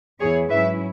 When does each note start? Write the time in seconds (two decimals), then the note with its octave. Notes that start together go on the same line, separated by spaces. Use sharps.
0.20 E2 E3 B3 E4 G#4 C#5
0.49 G#2 F#3 C#4 E4 B4 E5